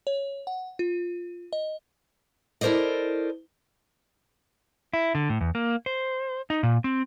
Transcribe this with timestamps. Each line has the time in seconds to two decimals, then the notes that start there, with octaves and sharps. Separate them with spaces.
0.07 C#5
0.47 F#5
0.79 F4
1.53 D#5
2.61 E4 A4 A#4 C5 D5 D#5
4.94 E4
5.15 D3
5.29 A2
5.41 E2
5.55 A#3
5.86 C5
6.50 D#4
6.63 A#2
6.84 C4